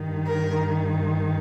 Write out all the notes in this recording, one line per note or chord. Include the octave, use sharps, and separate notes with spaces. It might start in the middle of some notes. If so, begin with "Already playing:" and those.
Already playing: G2 D#3
A#4